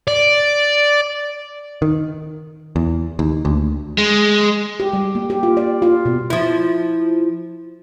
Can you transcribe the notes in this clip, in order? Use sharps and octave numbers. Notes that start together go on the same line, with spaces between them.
D5
D#3
E2
D#2
D2
G#3
G4
G3
A#3
G4
F4
D5
F4
B2
F3 E4